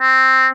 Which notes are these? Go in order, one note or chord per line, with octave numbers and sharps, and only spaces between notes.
C4